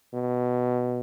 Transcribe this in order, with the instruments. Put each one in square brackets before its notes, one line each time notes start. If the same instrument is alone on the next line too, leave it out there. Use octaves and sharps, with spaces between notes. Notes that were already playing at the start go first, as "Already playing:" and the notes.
[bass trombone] B2